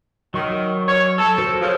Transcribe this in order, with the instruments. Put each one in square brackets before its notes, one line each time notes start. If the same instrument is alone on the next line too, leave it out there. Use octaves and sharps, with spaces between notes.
[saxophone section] D#3 [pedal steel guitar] F#3 C#6
[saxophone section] C#5
A4
[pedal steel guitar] F#4 A#4 C5
[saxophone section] C#3 F3